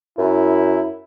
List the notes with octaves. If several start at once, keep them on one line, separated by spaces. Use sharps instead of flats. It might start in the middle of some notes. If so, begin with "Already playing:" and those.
F#2 E4